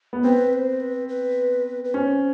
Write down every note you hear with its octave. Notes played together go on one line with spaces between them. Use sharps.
B3
C4 B4
C5
B4
B4
B4
C#4 C5